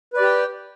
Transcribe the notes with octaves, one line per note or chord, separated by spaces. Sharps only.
G4 B4 D5 G5